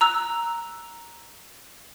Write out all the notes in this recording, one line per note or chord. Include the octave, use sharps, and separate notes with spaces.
A#5 E6 F#6